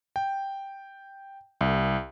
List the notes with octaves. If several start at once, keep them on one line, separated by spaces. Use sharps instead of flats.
G5
C2